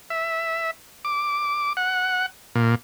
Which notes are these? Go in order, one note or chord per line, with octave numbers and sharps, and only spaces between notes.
E5
D6
F#5
A#2